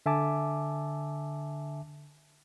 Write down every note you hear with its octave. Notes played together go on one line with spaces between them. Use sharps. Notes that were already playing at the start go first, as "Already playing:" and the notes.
D3 E5 G#5 A5 D6